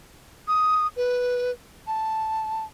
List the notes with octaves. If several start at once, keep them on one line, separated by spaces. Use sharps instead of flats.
D#6
B4
A5